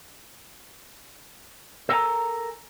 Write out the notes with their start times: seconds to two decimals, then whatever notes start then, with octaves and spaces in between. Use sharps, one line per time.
1.89 A4 A#4 C5 F#5 G#5 A#5